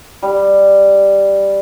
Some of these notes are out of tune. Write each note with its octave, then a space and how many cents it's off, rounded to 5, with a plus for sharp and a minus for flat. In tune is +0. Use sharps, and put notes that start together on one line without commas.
G3 +5